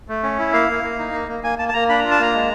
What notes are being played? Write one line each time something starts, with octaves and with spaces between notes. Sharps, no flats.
A3
C#4
E4
A#3 F5
A#3
A#3
D#4
A#3
A#3
A#3 G#5
A#3 A5
A5
A#3 A#5
D4 B5
F4 A#5
A5
A#3 A#5
G#3